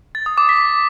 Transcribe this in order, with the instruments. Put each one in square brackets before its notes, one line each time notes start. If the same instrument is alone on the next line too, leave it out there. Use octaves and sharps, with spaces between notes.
[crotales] A6
D#6
D6
B6